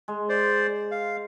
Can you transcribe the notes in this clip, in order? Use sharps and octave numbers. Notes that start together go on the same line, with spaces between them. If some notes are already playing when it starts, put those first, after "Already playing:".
G#3
C5 D5
F5